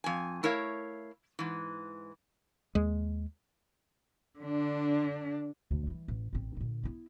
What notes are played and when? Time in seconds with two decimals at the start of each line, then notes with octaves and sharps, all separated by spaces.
0.04 F2 G#5
0.43 A3 E4 A#4 C#5 F5
1.39 G#2 E3
2.75 D#2 G#3
4.39 D3 D4
5.71 D2
5.87 E3 G3
6.08 A1
6.33 A1 C4
6.57 A#2 D3
6.83 B3 E4